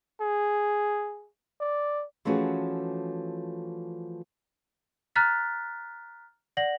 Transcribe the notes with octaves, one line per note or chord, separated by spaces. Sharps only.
G#4
D5
E3 F3 A3 C#4 F#4 G#4
A#5 F6 F#6 A6 B6
D5 F#5 A#6 F#7